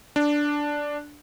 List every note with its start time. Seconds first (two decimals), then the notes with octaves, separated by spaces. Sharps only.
0.16 D4